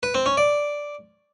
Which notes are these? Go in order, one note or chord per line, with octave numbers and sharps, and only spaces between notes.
B4
C4
C#4
D5